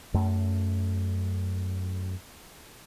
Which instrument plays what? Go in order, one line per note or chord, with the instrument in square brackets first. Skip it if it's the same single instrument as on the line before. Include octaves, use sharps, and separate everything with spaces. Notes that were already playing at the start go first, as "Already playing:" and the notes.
[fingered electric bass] F#2 A3